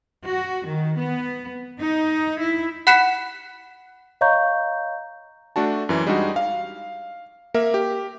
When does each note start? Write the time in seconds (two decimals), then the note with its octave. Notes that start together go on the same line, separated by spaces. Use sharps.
0.27 F#4
0.66 D#3
0.98 B3
1.78 D#4
2.39 E4
2.87 F#5 B5 F#6 B6 C#7 E7
4.21 C#5 D#5 F5 A#5 C#6 G6
5.56 A3 D4 F#4 A5
5.89 F#2 E3
6.07 G3 G#3 D4 D#4 F#4
6.36 F5
7.54 A#3 A#4 E5
7.74 G4